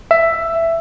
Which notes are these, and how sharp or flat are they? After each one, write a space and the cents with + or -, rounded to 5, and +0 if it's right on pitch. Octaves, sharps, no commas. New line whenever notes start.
E5 +10